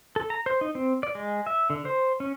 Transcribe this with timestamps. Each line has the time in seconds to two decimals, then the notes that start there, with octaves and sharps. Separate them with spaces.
0.16 A4
0.30 A#5
0.46 C5
0.61 D#4
0.75 C4
1.03 D5
1.15 G#3
1.47 E5
1.70 D3
1.85 C5
2.20 C#4